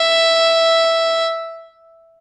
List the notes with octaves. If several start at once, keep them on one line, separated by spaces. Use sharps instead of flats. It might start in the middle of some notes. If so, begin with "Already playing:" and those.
Already playing: E5